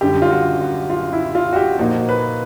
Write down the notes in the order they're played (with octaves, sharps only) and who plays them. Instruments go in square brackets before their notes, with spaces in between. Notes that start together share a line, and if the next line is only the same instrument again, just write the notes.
[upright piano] F#2 D3 G3 [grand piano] G4
[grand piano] F4
F#4
F#4
F4
E4
F4
F#4
G4
[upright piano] A#2 F3 A#3 D#4 [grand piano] F#4
[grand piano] B4